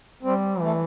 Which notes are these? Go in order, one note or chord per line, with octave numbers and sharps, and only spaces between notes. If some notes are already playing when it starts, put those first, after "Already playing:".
G3 C4
E3 A3